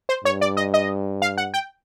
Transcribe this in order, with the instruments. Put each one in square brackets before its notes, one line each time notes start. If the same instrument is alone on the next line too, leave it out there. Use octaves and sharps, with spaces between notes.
[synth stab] C5
[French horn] G2 [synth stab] C#5
[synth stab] D5
D#5
D#5
F5
F#5
G5